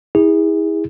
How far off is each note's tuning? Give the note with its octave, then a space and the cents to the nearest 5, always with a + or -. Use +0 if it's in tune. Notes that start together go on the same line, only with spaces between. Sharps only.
E4 -30 G#4 -30